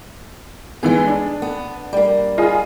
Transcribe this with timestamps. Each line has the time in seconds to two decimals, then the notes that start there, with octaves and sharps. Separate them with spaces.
0.83 E3 G#3 B3 G#4
1.07 D4
1.42 B3
1.93 G3 A#3
2.38 F4 G#4 D#5